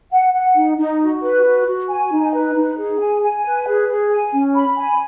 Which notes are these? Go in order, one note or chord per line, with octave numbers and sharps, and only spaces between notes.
F#5
F#5
D#4
D#4
F#4
B4
F#4
F#4
G#5
D#4
B4
D#4
G#4
G#5
G#5
B4
G#4
G#4
G#5
C#4
B5
G#5